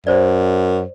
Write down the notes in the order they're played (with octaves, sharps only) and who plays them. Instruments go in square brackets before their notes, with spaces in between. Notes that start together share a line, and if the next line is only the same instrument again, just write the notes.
[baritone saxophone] F#2 [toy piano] C5 D5